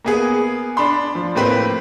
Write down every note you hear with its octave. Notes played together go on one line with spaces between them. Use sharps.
A#3 B3 G#4
D4 B5 C6
F3
A2 A#3 C4 B4 B6